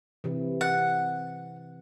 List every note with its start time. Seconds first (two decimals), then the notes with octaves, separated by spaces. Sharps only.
0.24 C3 E3
0.61 F#5